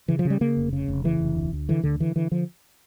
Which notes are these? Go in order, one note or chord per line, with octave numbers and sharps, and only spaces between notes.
C#3 E3
F3
C#3
G3
C#3 A#3
F1
C#3
F1
C#3 E3
F1
D2
D2
D3 E3
D2 D3
D3 E3
D3 E3
D3 F3